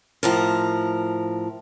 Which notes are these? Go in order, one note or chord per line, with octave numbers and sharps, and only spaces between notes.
A2 F3 A#4